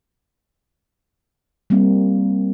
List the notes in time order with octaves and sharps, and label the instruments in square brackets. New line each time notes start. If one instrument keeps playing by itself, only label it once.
[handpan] G3 A#3 C4